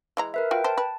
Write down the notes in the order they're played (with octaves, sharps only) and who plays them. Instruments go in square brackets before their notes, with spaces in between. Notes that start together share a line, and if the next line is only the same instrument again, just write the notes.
[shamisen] E3 G#3 A#5
[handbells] A#4 B4 E5
[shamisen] F4 F#4 [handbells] G5
[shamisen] C5 [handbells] A5
[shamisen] B4